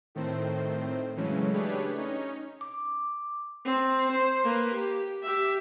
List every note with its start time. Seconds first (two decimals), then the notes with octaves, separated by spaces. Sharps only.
0.15 A2 D#3 A3 C4 C5
1.17 C#3 E3 F#3 G#3 A3 C#4
1.53 A3 D4 G4 G#4 B4 C#5
1.95 C#4 D#4 C#5
2.61 D6
3.65 C4
4.12 C5
4.44 A#3 B4
4.74 G4
5.23 G4 E5